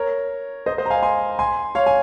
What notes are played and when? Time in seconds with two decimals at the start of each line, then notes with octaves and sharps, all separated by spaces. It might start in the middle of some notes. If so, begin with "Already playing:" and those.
Already playing: A#4 C#5
0.66 C5 D#5
0.78 C5 D#5
0.86 A#5
0.90 F5 G#5
1.03 G#5 C6
1.39 G#5 C6
1.75 C#5 F5
1.86 G#5